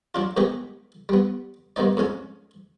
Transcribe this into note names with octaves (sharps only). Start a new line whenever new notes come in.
F#3 D4 F4
G#2 D#3 B3 G4 G#4
G3 B3
G2 D#3 B3 D#4 D5
F2 G#2 C#4 G#5